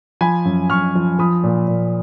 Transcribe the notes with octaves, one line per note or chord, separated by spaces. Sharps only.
F3 G#5 B5
F#2
F#2 C#6 F6
F3
F3 B5 D#6
A#2
A#2